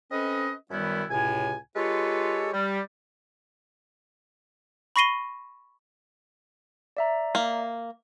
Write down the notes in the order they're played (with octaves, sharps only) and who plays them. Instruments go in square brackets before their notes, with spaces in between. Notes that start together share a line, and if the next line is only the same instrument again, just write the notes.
[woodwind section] C4 C#4 A4 B4 D#5
F#2 D#3 G3 B3 C#4 E4
C#2 A2 C3 G#5
G#3 F4 G4 A4 B4 C#5
G3
[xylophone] B5 C#6 A#6 C7 D#7 G7
[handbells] D5 E5 A#5
[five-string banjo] A#3